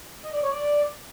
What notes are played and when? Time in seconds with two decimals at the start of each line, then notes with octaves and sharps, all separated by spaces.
0.24 D#5
0.33 D5
0.42 C#5
0.51 D5